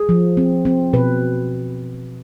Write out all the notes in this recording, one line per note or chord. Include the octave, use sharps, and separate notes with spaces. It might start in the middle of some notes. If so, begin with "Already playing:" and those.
Already playing: G#4
F3
C4
C4
B2 B4